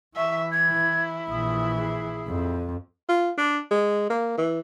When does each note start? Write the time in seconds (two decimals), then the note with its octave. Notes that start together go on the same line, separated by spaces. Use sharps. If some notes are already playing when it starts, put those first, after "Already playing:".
0.17 E3 E5 C#6
0.51 E4 G#6
1.30 A#1 E3 D#6
1.75 G#4
2.29 F2
3.09 F4
3.38 D4
3.71 G#3
4.10 A#3
4.38 E3